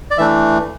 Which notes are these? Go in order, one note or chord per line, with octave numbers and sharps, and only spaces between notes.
D5
E3 A3 D4 E5